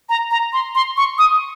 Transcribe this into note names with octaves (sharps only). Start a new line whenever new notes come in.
A#5
A#5
C6
C6
C#6
D#6